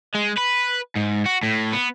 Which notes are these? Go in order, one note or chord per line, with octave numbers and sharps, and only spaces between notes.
G#3
B4
G#2
F#4
A2
B3